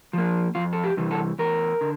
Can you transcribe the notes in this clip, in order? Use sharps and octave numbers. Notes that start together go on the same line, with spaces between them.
F3 A#3
F2 F4
A4
G4
C3 E3 G3
A4
E2 A#4
D3